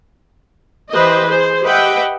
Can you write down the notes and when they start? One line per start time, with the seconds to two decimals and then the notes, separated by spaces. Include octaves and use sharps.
0.90 E3 G4 B4 C5 D#5
1.27 G#4 C5
1.63 G4 B4 D#5 E5 F#5 G5